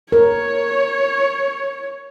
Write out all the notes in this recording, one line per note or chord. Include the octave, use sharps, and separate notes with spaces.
A#4 C#5